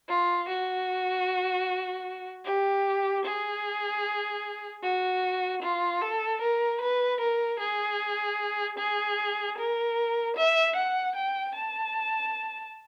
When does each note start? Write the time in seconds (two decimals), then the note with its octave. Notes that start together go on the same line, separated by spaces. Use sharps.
0.09 F4
0.48 F#4
2.46 G4
3.25 G#4
4.83 F#4
5.62 F4
6.01 A4
6.41 A#4
6.80 B4
7.20 A#4
7.59 G#4
8.78 G#4
9.57 A#4
10.36 E5
10.75 F#5
11.16 G5
11.55 A5